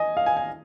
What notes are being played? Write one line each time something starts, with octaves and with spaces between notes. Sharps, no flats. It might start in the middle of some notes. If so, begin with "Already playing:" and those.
Already playing: D#5 G#5
F5
G#5
G#5